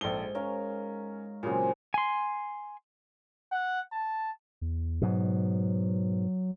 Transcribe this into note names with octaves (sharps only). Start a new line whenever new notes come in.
A#1 G#2 A4 G7
C#4 A#4 C#5 F5
A#2 C#3 F#3 C4 G#4
G#5 C6
F#5
A5
E2
G#2 B2 F#3